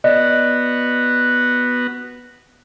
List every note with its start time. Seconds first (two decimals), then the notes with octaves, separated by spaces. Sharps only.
0.04 B3 F#4 D5 D#5